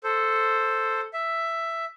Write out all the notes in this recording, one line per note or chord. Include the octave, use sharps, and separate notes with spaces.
A4 C5
E5